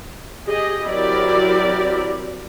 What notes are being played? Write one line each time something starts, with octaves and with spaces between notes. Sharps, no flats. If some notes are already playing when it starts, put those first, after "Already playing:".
G4 G#4 D#5
F#3 C4 E4 G4 A#4 D5